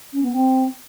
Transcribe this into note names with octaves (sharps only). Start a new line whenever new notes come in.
C#4
B3
C4